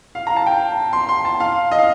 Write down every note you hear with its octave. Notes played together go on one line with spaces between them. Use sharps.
F5
A#5
A5
G5
C6
C6
A5
F5
D#5
F5